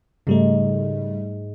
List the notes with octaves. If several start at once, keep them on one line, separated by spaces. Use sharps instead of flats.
G#2 C#3 G3 A3